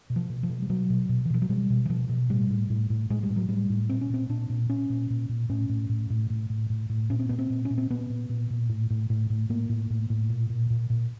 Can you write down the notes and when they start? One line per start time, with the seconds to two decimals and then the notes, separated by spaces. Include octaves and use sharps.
0.10 B2
0.16 F3
0.30 B2
0.43 F3
0.49 B2
0.62 G3
0.69 B2 F#3
0.90 B2
1.09 B2
1.25 E3
1.30 B2 F3
1.42 F#3
1.49 B2 G3
1.70 B2
1.85 E3
1.89 B2 F3
2.09 B2
2.30 A2 G3
2.50 A2
2.70 A2
2.90 A2
3.10 A2 G#3
3.23 G3
3.30 A2
3.36 F#3
3.49 A2 G3
3.70 A2
3.89 A#2 C4
4.01 C#4
4.10 A#2 C4
4.29 A#2 D4
4.49 A#2
4.70 A#2 C#4
4.90 A#2
5.10 A#2
5.29 A#2
5.49 A2 C#4
5.69 A2
5.89 A2
6.10 A2
6.30 A2
6.50 A2
6.70 A2
6.90 A2
7.10 A#2 C#4
7.19 C4
7.29 A#2 B3
7.39 C4
7.50 A#2
7.65 C#4
7.71 A#2
7.78 C4
7.90 A#2 B3
8.10 A#2
8.29 A#2
8.50 A#2
8.69 A2
8.90 A2
9.10 A2
9.30 A2
9.49 A2 A#3
9.69 A2
9.90 A2
10.10 A2
10.30 A#2
10.50 A#2
10.70 A#2
10.90 A#2